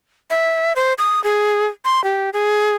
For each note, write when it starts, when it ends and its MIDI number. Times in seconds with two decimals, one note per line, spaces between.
0.30 0.73 76
0.76 0.93 72
0.98 1.23 87
1.24 1.66 68
1.85 2.03 84
2.04 2.30 67
2.33 2.75 68